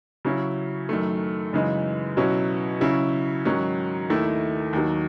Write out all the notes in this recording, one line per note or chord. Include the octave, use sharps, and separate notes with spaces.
C#3 F#3 C#4 E4
F#2 D#3 A3
F#2 C#3 E3 G#3 D#4
B2 F#3 C#4 E4
C#3 F#3 C#4 E4
G#2 D#3 F#3 C#4
D#2 D#3 A3 E4
D#2 D#3 F#3